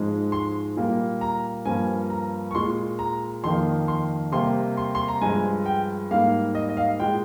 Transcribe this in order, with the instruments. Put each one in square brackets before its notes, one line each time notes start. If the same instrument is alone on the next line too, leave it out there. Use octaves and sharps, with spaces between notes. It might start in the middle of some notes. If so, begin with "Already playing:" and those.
Already playing: [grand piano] G#2 F3 G#3
C6
A#2 G3 A#3
A#5
G2 F3 A#3 G#5
A#5
C#6
A#2 G#3 C6
A#5
F2 D#3 A#3 C6
C6
C3 G3 A#3 C6
C6
C6
A#5
G2 F3 G#3 G#5
G5
G#2 G3 A#3 F5
D#5
D#5
F5
A#2 G#3 G5